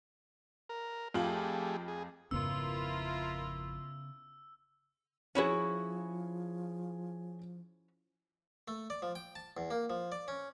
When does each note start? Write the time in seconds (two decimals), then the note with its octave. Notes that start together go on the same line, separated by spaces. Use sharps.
0.69 A#4
1.14 F2 A3 F4 G4 G#4 F#7
1.88 G#4
2.31 G#1 F2 C#3 B3 E4 F4 A#4 E6
5.35 F3 C#4 E4 F#4 G#4 C#5
8.68 A3
8.90 D5
9.02 F3
9.15 G5
9.35 A5
9.57 E2
9.71 A#3
9.90 F3
10.12 D5
10.28 C#4